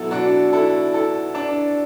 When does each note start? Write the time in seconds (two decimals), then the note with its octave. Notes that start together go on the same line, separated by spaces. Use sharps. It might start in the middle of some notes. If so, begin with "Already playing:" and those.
Already playing: B2 F#3 E4 A4
0.11 D4 F#4
0.53 E4 A4
0.94 E4 A4
1.35 D4